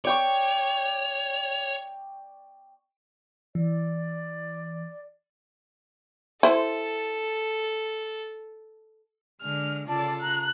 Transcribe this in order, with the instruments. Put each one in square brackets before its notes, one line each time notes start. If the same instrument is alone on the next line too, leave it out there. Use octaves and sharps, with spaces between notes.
[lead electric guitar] C#5 [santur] D5 G5 C#6
[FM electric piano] E3 [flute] D5
[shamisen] E4 C5 [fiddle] A4
[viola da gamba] D3 G#3 [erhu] F6
[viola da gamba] C#3 F4 A4 [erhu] D5 [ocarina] A5
[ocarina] A#5 [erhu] F#6